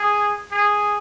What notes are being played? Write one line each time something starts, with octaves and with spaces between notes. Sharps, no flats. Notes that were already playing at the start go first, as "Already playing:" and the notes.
Already playing: G#4
G#4